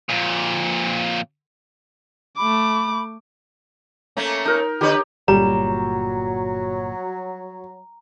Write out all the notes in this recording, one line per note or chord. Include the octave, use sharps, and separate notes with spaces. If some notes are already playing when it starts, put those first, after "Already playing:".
F2 A#2
A3 B5 D6
A3 A#3 C#4
D#4 A#4
D3 G4 B4 C#5 D#5
G1 A#2 F#3 G3 A#5